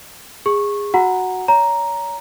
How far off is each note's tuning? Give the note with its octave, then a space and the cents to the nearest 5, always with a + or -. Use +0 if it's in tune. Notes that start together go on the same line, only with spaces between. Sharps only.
G#4 -20 C#6 -15
F#4 +0 F#5 +0 A#5 +0
C#5 +35 A#5 +5